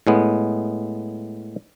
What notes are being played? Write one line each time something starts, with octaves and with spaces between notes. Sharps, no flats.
A2 G#3 B3